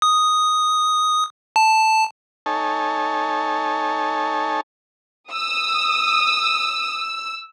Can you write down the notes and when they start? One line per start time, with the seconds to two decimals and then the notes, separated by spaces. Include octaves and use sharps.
0.02 D#6
1.56 A5
2.46 D#4 A4 C#5 G#5 A5
5.32 D#6 E6